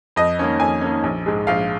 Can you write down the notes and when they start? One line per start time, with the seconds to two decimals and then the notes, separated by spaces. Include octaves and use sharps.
0.16 F2 D#5
0.39 D#3 A#3 C#4
0.60 F2 G#5
0.81 D#3 A#3 C#4
1.04 A#1
1.26 G#2 G#3
1.47 A#1 F5